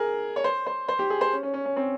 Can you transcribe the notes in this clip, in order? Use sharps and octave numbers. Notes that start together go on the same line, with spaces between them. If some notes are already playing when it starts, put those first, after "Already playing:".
Already playing: G#4 A#4
C#5
C5
C5
C5
G4
G#4
C5
C#4
C#4
C#4
C#4
C4